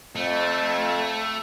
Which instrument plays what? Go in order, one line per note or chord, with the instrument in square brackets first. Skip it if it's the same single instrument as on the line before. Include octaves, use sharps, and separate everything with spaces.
[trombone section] F2 [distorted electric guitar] A3